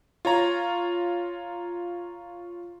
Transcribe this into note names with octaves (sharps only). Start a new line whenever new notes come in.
F4 C#5 A#5